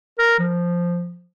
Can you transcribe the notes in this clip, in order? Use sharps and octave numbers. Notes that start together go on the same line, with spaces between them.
A#4
F3